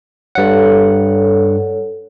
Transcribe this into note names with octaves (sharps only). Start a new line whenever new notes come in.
G2 A4 C#5 F#5